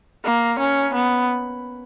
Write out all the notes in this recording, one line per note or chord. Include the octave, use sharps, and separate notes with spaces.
A#3
C#4
B3